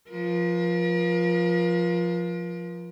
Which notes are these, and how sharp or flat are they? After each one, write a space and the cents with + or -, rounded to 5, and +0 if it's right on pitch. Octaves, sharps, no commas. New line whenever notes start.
F3 +0 A#4 +45